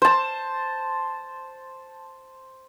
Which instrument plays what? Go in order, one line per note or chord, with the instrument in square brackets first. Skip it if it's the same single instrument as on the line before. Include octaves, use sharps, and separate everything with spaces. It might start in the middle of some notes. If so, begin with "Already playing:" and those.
[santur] C5 A5